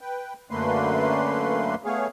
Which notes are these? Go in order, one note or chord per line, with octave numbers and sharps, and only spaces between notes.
B4 G5
F#2 D3 A3 A#3 B4 C6
A3 B3 G#4 C#5 F5